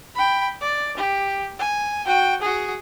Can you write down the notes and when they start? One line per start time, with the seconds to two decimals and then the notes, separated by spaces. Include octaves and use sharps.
0.15 G5 B5
0.61 D5
0.96 G4
1.59 G#5
2.06 F#4 G5
2.42 F#4 G#4